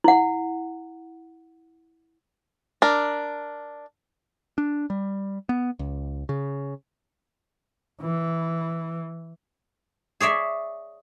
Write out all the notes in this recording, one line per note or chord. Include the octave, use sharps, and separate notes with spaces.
E4 F#5
D4 A#4
D4
G3
B3
C#2
C#3
E3
G#4 C#5 D5 E5